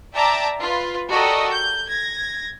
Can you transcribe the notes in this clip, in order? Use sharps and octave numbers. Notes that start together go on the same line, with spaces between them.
D5 E5 G5 A5 A#5 D6
F4 B4
F#4 G4 A4 A#4 D5 D#5
G6
G#6 A#6